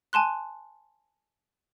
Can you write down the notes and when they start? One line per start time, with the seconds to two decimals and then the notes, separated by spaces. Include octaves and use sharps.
0.13 G#5 A5 C6 F#6